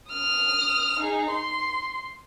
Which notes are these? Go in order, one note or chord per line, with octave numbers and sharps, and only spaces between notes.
D#6 F6
D#4 G#4
C6